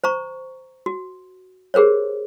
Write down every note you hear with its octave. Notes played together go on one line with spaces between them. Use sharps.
C5 A#5 C#6
F#4
G4 G#4 A#4 C5 C#5